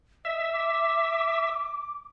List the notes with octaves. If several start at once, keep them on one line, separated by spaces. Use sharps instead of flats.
D#5 E5
D6